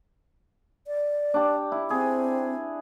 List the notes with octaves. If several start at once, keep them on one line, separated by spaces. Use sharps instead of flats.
D5
D4 G4
E4
C4 G#4